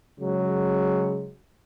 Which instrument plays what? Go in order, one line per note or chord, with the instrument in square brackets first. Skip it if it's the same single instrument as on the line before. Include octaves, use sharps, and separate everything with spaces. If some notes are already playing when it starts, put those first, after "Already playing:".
[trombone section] C#3 F#3 G#3